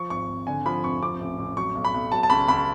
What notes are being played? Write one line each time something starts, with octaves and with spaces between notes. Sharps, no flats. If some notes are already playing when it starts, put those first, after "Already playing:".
Already playing: F3 C#6
G#1 C#6
G#1
D3 G#5
F3 B5
F1 C#6
F3 D6
A1
A1
F#3 C#6
B1
B5
B1
F#3 A5
A5
C#2 B5
C#2 B5